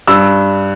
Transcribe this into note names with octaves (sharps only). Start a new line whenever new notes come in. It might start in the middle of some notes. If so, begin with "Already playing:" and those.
G2 E6